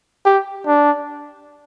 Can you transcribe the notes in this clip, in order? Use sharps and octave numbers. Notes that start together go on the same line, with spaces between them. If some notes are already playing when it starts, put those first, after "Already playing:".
G4
D4